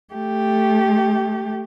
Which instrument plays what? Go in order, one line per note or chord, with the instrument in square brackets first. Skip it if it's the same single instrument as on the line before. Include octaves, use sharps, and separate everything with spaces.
[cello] A3 G4